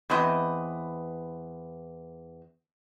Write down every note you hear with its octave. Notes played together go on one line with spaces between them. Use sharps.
E2 C4 B4 D#5